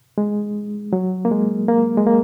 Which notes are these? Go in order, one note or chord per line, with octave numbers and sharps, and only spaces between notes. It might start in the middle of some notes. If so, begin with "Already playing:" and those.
G#3
F#3
A#3
G#3
A#3
G#3
A#3